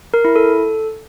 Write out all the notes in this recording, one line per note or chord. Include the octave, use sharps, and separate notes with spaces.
A#4
E4
A4